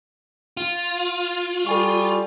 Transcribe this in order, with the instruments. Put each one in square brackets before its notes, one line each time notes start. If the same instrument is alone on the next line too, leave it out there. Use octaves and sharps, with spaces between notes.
[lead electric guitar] F4
[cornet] G3 [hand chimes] A4 G#5 C#6